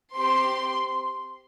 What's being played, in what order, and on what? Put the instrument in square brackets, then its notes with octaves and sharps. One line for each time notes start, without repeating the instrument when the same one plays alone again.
[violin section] C4 G4 C6